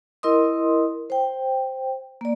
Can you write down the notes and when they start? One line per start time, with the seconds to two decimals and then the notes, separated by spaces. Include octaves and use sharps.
0.23 E4 A#4 D#5 C6 D#6
1.10 C5 G5
2.21 A#3 D5